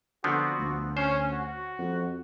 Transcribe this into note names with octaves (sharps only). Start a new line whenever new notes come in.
D3 F3 B3 C4 F#4
D2
C#4 C5
F#4
F2